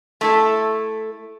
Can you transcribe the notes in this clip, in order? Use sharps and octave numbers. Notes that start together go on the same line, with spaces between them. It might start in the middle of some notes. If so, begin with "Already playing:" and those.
A3 E4 A4